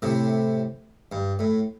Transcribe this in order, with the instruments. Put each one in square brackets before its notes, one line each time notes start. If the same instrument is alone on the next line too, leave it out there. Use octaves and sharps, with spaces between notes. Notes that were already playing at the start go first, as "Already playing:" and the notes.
[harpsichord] A2 C3
G2
A2